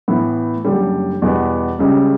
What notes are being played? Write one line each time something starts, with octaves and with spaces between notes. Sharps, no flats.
A2 E3 B3
F#1 F#2 D3 G3
E2 B2 G3 B3
C#2 C#3 G3